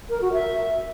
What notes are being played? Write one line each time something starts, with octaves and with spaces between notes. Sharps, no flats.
A#4
F#4
E5